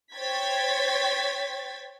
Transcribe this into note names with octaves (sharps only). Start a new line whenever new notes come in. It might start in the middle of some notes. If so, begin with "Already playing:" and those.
C5 C#5 G5 G#6 A6 B6